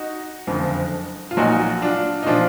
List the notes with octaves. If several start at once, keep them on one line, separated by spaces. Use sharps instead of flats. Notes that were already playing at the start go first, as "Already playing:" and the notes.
Already playing: D#4 F#4
F#1 F2 D3 F3
F4
A#1 A#2 F#3 D#4 F#4
D4 F4
D#4
A#2 F3 D4 F4